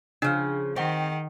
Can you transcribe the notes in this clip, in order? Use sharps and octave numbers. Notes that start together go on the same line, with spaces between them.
C#3 F3 D4 F6
D#3 C4 G#4 F#5